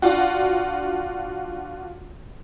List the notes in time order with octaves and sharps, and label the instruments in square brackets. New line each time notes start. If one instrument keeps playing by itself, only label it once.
[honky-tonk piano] D4 F4 F#4